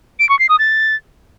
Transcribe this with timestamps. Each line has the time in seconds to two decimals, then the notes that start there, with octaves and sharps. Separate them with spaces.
0.19 D7
0.29 C#6
0.39 C7
0.49 D#6
0.59 A6